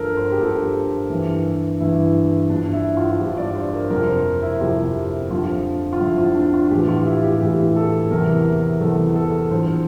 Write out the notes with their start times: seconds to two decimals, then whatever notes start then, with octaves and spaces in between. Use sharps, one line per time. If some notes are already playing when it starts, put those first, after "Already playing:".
Already playing: G2 F3 A4 A#4
0.17 C5
0.32 G4
0.40 G2 F3 A4
1.10 G2 E3
1.80 G2 E3 E4
2.49 G2 F3 D4
2.73 E4
2.97 F4
3.20 G2 F3 G4
3.37 D5
3.56 C5
3.73 A#4
3.90 F2 C3 F3 A#4
4.07 C5
4.42 E4
4.61 F2 C3 F3 G4
5.31 F2 D3 F3 F4
5.93 F4
6.00 F2 D3 F3 E4
6.18 F4
6.35 D4
6.54 F4
6.71 A2 E3 G4
6.88 F4
7.05 E4
7.23 G4
7.40 A2 E3 G4
7.76 A4
8.11 E2 C3 E3 A#4
8.80 E2 C3 E3 A4
9.15 A4
9.51 E2 D3 F3 C5